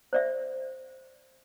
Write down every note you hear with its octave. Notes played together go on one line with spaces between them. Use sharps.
C5 D5 E5